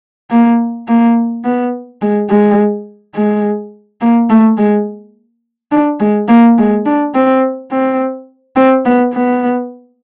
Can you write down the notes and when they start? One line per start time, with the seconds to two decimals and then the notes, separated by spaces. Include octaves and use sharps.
0.31 A#3
0.88 A#3
1.44 B3
2.02 G#3
2.30 G#3
3.15 G#3
4.01 A#3
4.30 A3
4.57 G#3
5.72 D4
6.00 G#3
6.28 A#3
6.58 G#3
6.86 D4
7.14 C4
7.71 C4
8.56 C4
8.85 B3
9.13 B3